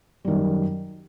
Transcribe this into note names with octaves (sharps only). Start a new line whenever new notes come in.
F#2 D#3 G3